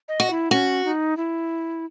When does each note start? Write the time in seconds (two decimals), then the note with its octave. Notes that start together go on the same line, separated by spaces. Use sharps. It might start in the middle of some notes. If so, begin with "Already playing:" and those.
0.08 D#5
0.20 F#4
0.31 E4
0.51 C#4 F#4
0.85 D#4
1.17 E4